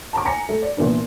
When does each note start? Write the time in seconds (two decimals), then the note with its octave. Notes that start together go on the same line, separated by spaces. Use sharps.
0.13 A5 A#5 D6
0.25 G#5 A#5 A#6 C#7
0.49 A3
0.62 D5
0.77 A#2 E3 A#3 B3 D4